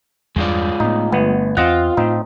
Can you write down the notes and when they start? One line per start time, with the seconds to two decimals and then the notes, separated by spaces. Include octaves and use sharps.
0.36 E2 G2 G#3 F4 D5
0.80 A2 B3 D#4
1.12 G1 A3 B3
1.57 E2 C4 F4 D#5 F#5
1.97 A2 C4 D#4